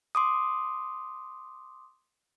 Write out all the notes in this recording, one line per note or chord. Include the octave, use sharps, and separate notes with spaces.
C6 D6 D#6